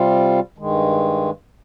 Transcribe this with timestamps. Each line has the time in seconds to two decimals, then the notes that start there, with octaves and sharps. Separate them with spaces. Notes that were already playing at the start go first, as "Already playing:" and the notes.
Already playing: C3 G3 C4 F4
0.58 G2 D#3 G#3